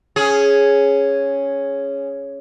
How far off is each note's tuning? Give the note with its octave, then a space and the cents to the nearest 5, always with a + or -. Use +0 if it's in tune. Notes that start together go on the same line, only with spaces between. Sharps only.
C#4 +0 G#4 +0